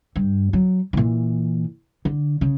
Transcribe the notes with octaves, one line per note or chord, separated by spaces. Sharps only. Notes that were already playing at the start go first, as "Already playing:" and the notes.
G2
F#3
A#2 E3
D3
C#3